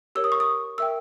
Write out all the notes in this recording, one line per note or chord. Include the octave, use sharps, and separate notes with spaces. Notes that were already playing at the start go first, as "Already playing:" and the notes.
G4 A#4 C#5 E6
D#6
C#6
D#6
A#4 E5 G5 E6